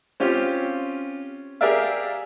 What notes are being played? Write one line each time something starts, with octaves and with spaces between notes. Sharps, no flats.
C4 C#4 F4 G4
G4 G#4 A#4 D5 E5 F5